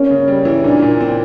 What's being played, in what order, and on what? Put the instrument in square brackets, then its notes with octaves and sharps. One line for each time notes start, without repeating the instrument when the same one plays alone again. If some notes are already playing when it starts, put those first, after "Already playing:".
Already playing: [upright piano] A#3 [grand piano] C#4
[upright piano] C#3
G3
E3
[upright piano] A#2 [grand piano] D4
[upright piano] A#2
C4